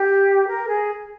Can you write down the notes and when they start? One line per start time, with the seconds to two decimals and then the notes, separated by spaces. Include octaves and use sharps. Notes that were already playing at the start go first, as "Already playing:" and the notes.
Already playing: G4
0.47 A#4
0.67 G#4